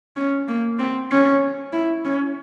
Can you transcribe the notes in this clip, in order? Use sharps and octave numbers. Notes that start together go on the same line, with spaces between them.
C#4
A#3
C4
C#4
E4
C#4